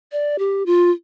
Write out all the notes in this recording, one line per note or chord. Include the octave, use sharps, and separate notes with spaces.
D5
G4
F4